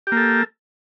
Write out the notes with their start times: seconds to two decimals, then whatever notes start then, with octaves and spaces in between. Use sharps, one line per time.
0.07 G4
0.12 A#3
0.17 A4